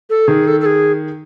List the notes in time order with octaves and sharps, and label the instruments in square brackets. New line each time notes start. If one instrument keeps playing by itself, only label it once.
[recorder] A4
[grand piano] D#3 [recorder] G#4
[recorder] A4
A4
G#4